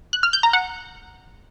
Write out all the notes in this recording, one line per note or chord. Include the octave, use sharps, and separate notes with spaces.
F#6
F6
G6
A#5
F#5